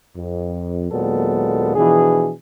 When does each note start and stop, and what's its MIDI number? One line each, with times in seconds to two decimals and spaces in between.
0.16 0.86 41
0.90 1.74 39
0.90 1.74 46
0.90 1.74 54
0.90 1.74 56
0.90 1.74 59
0.90 1.74 69
1.76 2.32 47
1.76 2.32 52
1.76 2.32 53
1.76 2.32 62
1.76 2.32 68